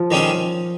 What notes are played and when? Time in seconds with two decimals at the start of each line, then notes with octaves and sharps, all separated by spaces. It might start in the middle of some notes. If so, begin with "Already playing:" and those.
Already playing: F3
0.11 D#3 G3 C#4 G#4